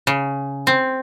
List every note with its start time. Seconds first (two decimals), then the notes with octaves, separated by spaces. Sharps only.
0.07 C#3
0.67 C4